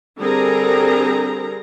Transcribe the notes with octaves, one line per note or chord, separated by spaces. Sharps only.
D3 G3 C4 G#4 A#4 A#5